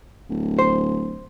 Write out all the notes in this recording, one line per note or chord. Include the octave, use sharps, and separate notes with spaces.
D1
C5